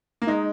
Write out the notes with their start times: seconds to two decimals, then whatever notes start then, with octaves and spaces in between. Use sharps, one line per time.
0.22 A#3
0.27 G#3 D#4